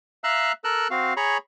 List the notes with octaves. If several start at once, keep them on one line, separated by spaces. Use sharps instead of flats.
E5 F5 A#5 E6 F#6
A4 A#4 E6 F#6
C4 F#4 F5
G#4 C#5 A#5 B5 C#6